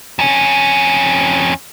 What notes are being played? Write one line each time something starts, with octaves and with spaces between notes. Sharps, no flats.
F2 C#4